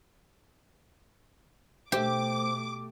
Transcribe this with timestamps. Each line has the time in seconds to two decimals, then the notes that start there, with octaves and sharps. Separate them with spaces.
1.92 B2 A3 G4 C5 E5 D6